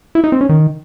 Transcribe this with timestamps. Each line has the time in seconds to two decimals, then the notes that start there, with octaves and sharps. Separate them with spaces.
0.15 E4
0.24 D#4
0.32 C4
0.41 C#4
0.49 D#3